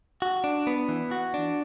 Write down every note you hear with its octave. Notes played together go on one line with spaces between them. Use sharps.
F#4
D4
B3
E3
F#4
D4